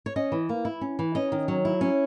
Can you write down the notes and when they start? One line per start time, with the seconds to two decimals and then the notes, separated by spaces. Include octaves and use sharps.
0.06 C#5
0.16 C#4 D#5
0.32 E3
0.49 A#3
0.65 E4
0.81 C#4
0.99 E3
1.15 C#4 D#5
1.32 D#3
1.48 F#3
1.65 E4
1.81 C#4